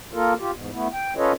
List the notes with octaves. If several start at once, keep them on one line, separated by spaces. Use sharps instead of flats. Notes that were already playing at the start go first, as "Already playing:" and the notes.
A#3 F4 A4 A#4
F4 G4
E2 G#2
A3 B3 E4
G5
C#4 F4 A4 B4 C#5 D#5